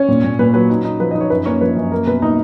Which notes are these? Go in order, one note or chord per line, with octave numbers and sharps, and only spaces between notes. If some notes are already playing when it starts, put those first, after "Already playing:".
Already playing: C#4 C#5
A#2
A#2
A#2 B4
F#3 B4
D#4
D#4
F3 B4
D#4 D#5
C#5
F#2 B4
A#3 C#4 C#5
F3 B4
F#2
A#3 A#4
B2 B4
A#3 D#4 D#5